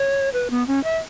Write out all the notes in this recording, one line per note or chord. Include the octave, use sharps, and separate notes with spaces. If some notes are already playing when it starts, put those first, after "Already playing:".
Already playing: C#5
B4
B3
C#4
E5